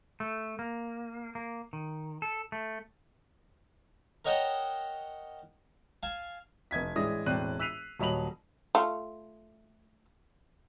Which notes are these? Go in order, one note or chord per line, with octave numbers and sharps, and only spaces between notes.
A3
A#3
A#3
D#3
A4
A3
A#4 C#5 D#5 F#5 G5 A5
F5 G#5 A5
F1 D#5 G#6 B6
A1 G#3 E4 D5 D#6 A#6
E1 A2 C4 D5 F#6 D#7
E6 F#6 B6 C7 D#7 F7
D#1 F#3 D#5 B5 F7 F#7
A3 F4